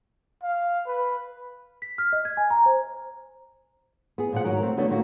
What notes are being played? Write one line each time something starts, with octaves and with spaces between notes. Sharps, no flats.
F5
B4
B6
F6
D#5
G#6
G#5
A#5
C5
B3 G#4
A#2 F3 F#5
G#2 D#3 F#3 A#4 F#5
A3 C4
D3 F#3 A3 B3 D4
A2 D3 A3 A#3 F#4